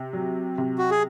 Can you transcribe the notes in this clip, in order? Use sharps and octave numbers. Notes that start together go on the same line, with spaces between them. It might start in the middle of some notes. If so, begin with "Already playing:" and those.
Already playing: C3
F#3
C3
F#4
G#4